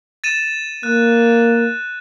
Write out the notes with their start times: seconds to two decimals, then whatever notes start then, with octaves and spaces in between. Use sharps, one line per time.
0.24 A6 D#7 E7
0.83 A#3 F#6